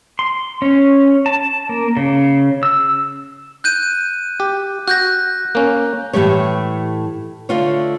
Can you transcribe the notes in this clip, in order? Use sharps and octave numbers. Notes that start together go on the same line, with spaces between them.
C6
C#4
A5
A#3
C#3
E6
F#6 G6 D#7
G4
F#4 F#6 G6 A#6
A#3 C#4
A2 E3 A3 G4 C#5
D3 A3 F4 C#5